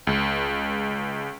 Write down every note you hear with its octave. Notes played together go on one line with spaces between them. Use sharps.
C#2